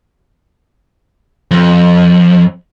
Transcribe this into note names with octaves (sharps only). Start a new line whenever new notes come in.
F2